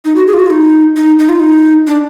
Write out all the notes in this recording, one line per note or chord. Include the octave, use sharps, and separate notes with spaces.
D#4
F#4
G#4
F4
F#4
F4
D#4
D#4
D#4
F4
D#4
D4